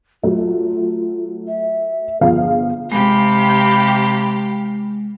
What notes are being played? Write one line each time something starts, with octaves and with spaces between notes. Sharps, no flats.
F#3 A3 F4
E5
G1 F3 G#4 F5
C3 G#3 G4 F5 B5